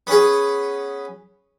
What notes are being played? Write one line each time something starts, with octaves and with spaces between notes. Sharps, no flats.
B3 C#4 G#4